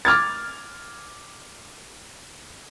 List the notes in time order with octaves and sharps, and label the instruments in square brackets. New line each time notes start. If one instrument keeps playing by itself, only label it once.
[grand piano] D6 F6 G#6 A6